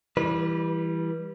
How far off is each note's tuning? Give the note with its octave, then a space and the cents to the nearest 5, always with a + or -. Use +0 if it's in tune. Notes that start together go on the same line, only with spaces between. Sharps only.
E3 +5 G3 +5 B4 -30